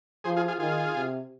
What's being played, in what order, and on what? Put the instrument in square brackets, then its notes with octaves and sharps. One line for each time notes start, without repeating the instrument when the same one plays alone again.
[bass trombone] F3 [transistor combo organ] G#4 C5
[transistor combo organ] F4 G#4
F4 G#4
[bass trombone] D#3 [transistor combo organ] F4 G#4
[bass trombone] C3